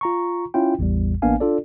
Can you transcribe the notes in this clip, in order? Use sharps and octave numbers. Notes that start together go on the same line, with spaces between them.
F4 A#5 C#6
C#4 E4 F4 G5
A1 E2 A2 G3
A1 A#3 B3 D4 F5 G#5
D4 F4 A4 D5